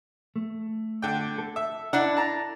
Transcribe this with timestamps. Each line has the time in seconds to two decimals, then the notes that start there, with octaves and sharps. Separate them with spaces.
0.36 A3
1.02 D3 G5
1.38 A4
1.56 E5
1.93 D4 E4 D5 F#5
2.17 A5 A#5